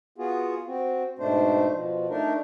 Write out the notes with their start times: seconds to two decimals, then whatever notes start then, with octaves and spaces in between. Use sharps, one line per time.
0.18 B3 F4 F#4 G#4
0.67 C4 F#4
1.19 G#2 B2 A3 D4 C5
1.72 B2 F3
2.10 A3 D4 D#4 A#4